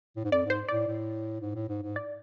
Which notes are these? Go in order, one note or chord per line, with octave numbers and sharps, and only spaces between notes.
A2
G#2
F2 D5
G#2 C5
A2 D5
A2
G#2
A2
G#2
G#2
D5